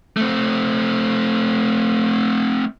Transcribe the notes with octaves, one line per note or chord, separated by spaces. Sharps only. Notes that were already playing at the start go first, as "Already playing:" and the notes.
A3 C4